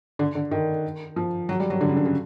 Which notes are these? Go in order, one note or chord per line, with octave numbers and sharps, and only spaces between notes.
D3
D3
D#3
F3
F#3
G3
F#3
D3
C#3
D3
C#3